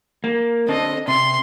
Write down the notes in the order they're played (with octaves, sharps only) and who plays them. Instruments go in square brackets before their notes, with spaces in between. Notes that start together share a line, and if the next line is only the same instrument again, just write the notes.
[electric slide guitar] A#3
[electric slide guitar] D3 C4 A4 [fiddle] D#5
[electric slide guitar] C3 [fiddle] C6